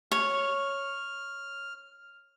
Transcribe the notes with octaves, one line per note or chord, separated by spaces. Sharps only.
C#5 F6